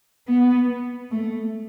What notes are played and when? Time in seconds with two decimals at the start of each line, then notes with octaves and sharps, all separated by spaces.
0.27 B3
1.11 A3